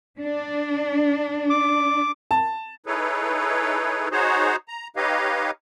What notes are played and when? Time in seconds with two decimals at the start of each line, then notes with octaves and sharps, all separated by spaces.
0.21 D4
1.50 D6
2.31 A5
2.86 D#4 E4 G#4 A4 B4 C#5
4.11 D#4 F#4 G#4 C5 C#5
4.68 A#5
4.96 D#4 G4 B4 C#5 D#5 F5